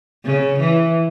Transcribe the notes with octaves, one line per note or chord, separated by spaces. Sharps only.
C#3
E3